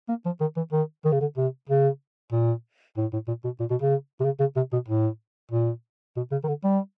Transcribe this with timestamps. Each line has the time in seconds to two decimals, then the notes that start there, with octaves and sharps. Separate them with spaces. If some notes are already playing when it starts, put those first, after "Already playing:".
0.09 A#3
0.25 F3
0.41 D#3
0.57 E3
0.72 D#3
1.05 D#3
1.12 C#3
1.21 D3
1.37 C3
1.69 C#3
2.33 A#2
2.97 A2
3.13 A2
3.28 A#2
3.44 B2
3.60 A#2
3.70 B2
3.82 C#3
4.20 C3
4.25 C#3
4.40 C#3
4.56 C3
4.73 B2
4.88 A2
5.51 A#2
6.17 B2
6.32 C#3
6.44 D#3
6.48 D3
6.64 G3